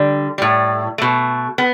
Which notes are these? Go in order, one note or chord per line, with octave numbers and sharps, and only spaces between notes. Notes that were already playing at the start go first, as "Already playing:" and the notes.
Already playing: D3 G3
A2 G3
B2 A3
B3